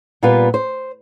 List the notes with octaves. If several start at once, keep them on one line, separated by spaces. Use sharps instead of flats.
A#2 G3 B3 F4 B4
C5